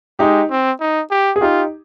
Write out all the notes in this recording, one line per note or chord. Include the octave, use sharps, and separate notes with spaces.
G#3 D#4 G4
C4
D#4
G4
G#4
D#4 F4 G4